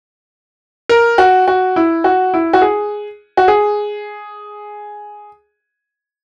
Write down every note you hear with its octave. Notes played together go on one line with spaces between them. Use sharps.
A#4
F#4
F#4
E4
F#4
E4
F#4
G#4
F#4
G#4